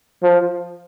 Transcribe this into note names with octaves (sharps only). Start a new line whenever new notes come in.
F3